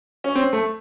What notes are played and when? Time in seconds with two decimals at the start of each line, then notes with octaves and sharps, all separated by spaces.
0.24 C#4
0.35 C4
0.53 A3